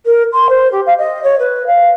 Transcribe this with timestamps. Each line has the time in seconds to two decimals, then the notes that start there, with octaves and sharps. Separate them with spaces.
0.05 A#4
0.32 C6
0.49 C5
0.71 G4
0.86 F5
0.98 D#5
1.23 C#5
1.39 B4
1.66 F5